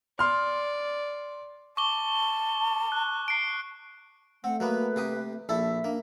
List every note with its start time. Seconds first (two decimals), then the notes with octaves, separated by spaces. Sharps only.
0.19 D5 C6 F6
1.77 A5 C#6 D6 G7
2.92 F#6
3.28 C7 D7
4.44 A3 C4 F#5
4.60 F#3 A#3 B3 B4
4.96 C3 G4 D#6
5.49 A#1 E4 A4 E5
5.84 A#3 D4